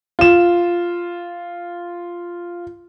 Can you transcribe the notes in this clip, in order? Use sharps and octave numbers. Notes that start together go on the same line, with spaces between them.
F4 E7